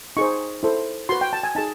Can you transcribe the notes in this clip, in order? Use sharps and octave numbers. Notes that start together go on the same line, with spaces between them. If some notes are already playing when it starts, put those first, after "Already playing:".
D#4 G#4 C5 C#6
E4 A4 C5
F#4 B4 C6
G5
A5
G#5
D#4 G#4 A5